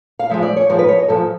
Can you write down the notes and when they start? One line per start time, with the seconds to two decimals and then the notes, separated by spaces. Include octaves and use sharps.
0.19 F5
0.30 G#2 F3 G#3 E5
0.43 D5
0.56 C#5
0.69 G#2 F3 G#3 C5
0.79 B4
0.89 C#5
0.98 D#5
1.08 G#2 F3 G#3 A4